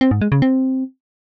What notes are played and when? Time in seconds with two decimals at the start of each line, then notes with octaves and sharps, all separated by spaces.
0.01 C4
0.11 G#2
0.22 G#3
0.32 C#3
0.42 C4